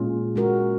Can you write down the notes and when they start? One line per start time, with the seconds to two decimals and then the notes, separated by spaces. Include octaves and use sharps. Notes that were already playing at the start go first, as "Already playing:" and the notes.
Already playing: A#2 G#3 C#4 F4 G#4
0.36 G#3 C#4 F#4 A#4